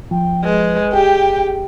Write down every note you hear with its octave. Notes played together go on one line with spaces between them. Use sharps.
F3 G5
G#3 B4
G4 G#4 G5